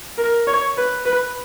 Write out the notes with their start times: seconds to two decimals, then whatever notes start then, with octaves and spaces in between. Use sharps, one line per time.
0.18 A#4
0.47 C#5
0.77 B4
1.06 B4